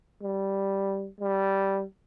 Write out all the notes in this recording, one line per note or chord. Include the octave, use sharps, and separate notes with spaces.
G3
G3